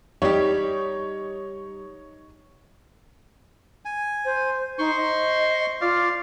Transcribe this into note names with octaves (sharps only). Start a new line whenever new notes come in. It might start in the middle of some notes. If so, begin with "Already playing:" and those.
G3 D#4 G4 C#5
G#5
C5
D#4 C5 C6 C#6
D#5
F4 D5 F5